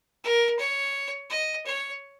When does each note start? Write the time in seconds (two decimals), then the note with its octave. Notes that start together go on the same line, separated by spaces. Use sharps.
0.24 A#4
0.59 C#5
1.30 D#5
1.66 C#5